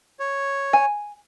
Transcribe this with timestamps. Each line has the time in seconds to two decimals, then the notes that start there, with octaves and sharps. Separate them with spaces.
0.20 C#5
0.73 G#5